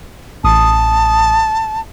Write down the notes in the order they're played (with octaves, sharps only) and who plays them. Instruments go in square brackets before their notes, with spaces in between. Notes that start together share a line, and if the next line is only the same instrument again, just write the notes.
[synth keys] A1 D#6 [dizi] A5